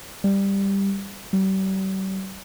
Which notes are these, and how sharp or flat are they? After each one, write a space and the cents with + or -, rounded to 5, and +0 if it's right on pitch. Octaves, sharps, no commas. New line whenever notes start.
G3 +10
G3 -40